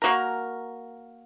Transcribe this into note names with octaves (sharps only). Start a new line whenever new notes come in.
A#3 F#4 A#4